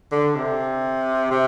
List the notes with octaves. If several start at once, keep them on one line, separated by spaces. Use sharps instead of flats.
D3
C3
C3